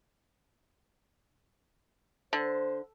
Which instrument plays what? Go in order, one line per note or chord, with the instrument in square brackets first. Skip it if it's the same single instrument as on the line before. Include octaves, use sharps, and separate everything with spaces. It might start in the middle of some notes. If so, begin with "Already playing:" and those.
[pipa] D3 [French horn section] C5